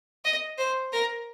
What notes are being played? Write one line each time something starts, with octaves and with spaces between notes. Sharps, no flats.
D#5
C5
A#4